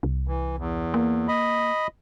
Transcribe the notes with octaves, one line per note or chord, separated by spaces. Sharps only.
C2
E3
E2
A#3
D#5 B5